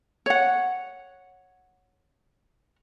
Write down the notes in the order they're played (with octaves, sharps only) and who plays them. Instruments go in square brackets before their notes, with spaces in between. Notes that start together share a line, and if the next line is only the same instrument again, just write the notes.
[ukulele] C#5 F#5